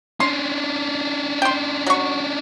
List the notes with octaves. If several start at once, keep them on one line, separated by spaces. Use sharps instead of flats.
C#4 D4 C6
G5 C6
F#3 C#6